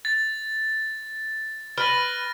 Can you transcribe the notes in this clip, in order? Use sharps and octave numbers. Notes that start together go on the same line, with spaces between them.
A6
B4 F6 A6 A#6